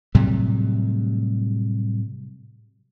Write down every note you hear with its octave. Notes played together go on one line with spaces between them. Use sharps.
A2 C3 F#3 G3